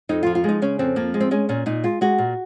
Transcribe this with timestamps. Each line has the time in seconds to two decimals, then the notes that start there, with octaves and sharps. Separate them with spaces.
0.09 F2 D#4
0.23 F4
0.26 F3
0.35 F4
0.44 G#3 D#4
0.62 C#3 C#4
0.79 F2 C4
0.96 F3 A#3
1.14 G#3
1.20 C4
1.31 G#3 C#4
1.49 A#2 C#4
1.66 A#2 D#4
1.84 G#3 F4
2.01 G#3 F#4
2.18 A#2